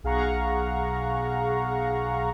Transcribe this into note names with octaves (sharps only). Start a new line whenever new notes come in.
B1 G#4 F5 F#5 A#5 C#6